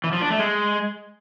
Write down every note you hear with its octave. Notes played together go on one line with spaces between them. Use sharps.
E3
F3
D4
A3
G#3